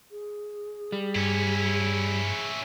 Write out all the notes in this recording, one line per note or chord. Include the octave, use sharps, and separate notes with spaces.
G#4
G3
G2 C#4 E4